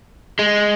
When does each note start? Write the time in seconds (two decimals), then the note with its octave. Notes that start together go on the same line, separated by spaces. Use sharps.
0.39 G#3